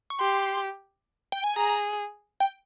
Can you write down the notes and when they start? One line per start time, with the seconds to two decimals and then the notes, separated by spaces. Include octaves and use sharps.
0.10 C#6
0.19 G4 C6
1.32 G5
1.44 G#5
1.56 G#4 A#5
2.40 G5